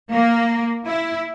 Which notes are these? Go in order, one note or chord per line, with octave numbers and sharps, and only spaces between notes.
A#3
E4